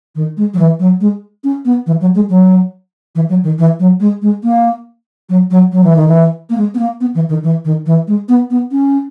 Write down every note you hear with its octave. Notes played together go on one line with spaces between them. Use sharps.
D#3
G#3
F#3
E3
F#3
G#3
C#4
B3
E3
F#3
G#3
F#3
E3
F#3
D#3
E3
F#3
G#3
G#3
A#3
F#3
F#3
F#3
E3
D#3
E3
A#3
G#3
B3
A#3
B3
E3
D#3
E3
D#3
E3
G#3
B3
B3
C#4